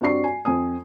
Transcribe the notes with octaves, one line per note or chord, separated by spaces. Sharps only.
G2 C4 F#4 D5 C#6 C7
G#5
F2 C4 G#5 D#6